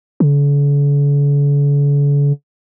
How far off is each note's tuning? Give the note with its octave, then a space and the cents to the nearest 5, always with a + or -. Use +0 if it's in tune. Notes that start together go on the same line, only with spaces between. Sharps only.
D3 -45